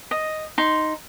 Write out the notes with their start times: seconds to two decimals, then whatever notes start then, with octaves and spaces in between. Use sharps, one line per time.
0.11 D#5
0.58 D#4 C6